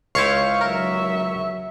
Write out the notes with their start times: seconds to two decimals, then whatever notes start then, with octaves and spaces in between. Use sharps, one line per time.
0.15 C#2 E4 C5 C#5 F5 C#6
0.61 F#3 A#4 E5